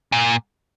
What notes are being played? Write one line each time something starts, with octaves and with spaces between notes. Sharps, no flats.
A#2